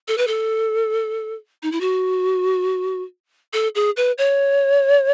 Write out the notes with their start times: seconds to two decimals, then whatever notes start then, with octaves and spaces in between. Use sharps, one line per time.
0.08 A4
0.18 B4
0.27 A4
1.63 D#4
1.72 E4
1.81 F#4
3.53 A4
3.75 G#4
3.97 B4
4.18 C#5